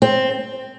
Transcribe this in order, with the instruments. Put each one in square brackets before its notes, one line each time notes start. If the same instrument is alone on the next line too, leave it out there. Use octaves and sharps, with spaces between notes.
[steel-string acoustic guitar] C4